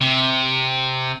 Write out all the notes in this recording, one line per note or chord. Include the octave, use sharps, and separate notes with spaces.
C3